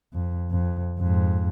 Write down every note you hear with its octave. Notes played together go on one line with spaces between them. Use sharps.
F2
F2
F2 G#2